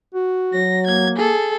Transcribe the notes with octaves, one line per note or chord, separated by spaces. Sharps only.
F#4
F#3 A#6
A#3 G#6
G#4 A4